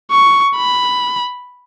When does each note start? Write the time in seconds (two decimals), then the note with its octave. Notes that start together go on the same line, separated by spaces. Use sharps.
0.11 C#6
0.56 B5